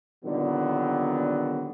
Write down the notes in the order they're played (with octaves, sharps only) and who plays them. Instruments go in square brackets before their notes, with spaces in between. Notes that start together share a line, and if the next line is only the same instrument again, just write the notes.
[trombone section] A#2 D3 D#3 F#3 G3 B3